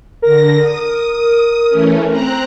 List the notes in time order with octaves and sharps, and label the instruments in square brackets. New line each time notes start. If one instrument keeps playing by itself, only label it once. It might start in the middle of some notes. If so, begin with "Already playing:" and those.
[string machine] D3 A#6 [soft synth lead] A#4
[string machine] D#6
E3 A3 C#4
C4 A#5 F#6